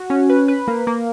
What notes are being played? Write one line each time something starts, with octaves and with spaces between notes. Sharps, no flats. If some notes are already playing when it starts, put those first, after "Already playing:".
Already playing: F#4
C#4
B4
B4
A#3
A#3